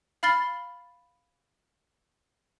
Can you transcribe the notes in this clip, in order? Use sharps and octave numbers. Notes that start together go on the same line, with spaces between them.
F5 B5 F6 A6 C7 G7